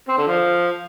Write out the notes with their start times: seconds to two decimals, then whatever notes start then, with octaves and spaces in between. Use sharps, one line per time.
0.09 C4
0.18 D3
0.27 F3